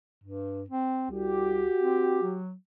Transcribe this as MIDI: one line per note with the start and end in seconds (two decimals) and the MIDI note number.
0.24 0.63 43
0.70 1.06 60
1.11 1.64 36
1.11 2.41 66
1.11 2.41 67
1.80 2.20 60
2.22 2.53 54